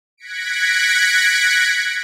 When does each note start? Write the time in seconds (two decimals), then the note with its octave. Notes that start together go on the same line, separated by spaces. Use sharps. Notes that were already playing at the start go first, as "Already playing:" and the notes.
0.17 F#6 G#6 A#6 B6 C#7 D7